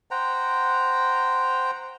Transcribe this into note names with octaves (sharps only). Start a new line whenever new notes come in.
C5 F#5 G5 A#5